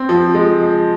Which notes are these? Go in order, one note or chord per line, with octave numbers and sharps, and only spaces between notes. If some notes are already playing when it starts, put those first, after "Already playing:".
Already playing: C4
F3
G#3